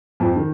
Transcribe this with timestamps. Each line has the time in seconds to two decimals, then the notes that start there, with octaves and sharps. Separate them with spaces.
0.20 F2 F3
0.36 D#3